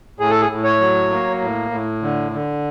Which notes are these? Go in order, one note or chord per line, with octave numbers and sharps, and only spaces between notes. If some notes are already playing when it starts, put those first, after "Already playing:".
A2 G#4
A4
G#4
A2
C#5
F#3
A#3
A2
A2
D3
D3